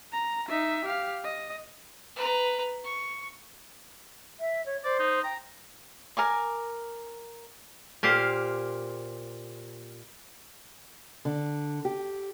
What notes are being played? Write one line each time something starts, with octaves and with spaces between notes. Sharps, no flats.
A#5
D#4 E5
G4 F5
D#5
B4 A#5
C#6
E5
C#5
C5 D5
D#4
G5 A#5
A#4 G#5 D6
A#2 G4 C5 F5
D3
G4